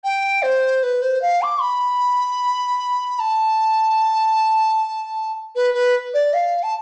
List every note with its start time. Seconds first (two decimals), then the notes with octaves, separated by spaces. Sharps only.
0.04 G5
0.42 C5
0.83 B4
1.02 C5
1.21 F5
1.42 D6
1.61 B5
3.19 A5
5.55 B4
5.74 B4
6.14 D5
6.33 F5
6.63 A5